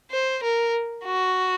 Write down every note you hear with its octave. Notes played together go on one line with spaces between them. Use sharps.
C5
A#4
F#4